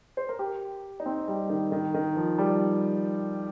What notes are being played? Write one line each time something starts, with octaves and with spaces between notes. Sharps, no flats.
C5
A#4
G4
D#4
C4
G3
D#3
D#3
D#3
F3
G3